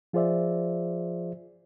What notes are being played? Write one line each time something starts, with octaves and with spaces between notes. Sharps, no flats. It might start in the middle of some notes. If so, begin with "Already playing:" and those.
F3 F4 G#4 C5 D5 E5